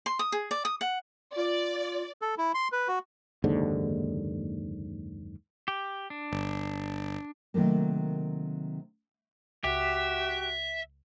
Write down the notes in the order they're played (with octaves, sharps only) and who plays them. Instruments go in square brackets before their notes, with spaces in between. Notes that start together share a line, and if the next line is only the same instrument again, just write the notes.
[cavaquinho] C6
D#6
G#4
D5
D#6
F#5
[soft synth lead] F4 [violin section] D5
[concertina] A4
E4
C6
B4
F#4
[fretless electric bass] F#1 D#2 G#2 D3
[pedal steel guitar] G4
D4
[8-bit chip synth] G1
[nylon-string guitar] C3 D#3 F#3 A3 A#3
[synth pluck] C#2 [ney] F#4 [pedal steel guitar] G4 [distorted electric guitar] E5